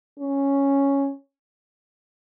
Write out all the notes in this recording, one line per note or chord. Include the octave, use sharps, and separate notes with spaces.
C#4